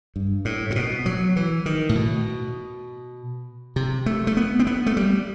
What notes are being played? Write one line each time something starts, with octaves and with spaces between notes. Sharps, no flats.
G2
A2
A2
B2
F#3
E3
D#3
A2
B2
C3
A3
A3
B3
C4
B3
A3
G3